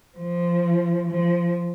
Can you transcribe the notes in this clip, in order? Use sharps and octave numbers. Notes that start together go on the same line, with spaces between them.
F3
F3